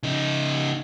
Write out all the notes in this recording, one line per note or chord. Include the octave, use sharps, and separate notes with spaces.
C#3 D#4